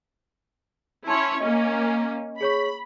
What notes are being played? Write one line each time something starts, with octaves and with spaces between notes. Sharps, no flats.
C#4 E4 C#5 A5 C6
A#3 C#4 D#5
G#4 C#5 B5 C#6